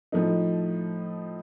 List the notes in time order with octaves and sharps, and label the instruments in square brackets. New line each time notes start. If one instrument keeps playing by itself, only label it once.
[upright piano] A2 F3 A3 D#4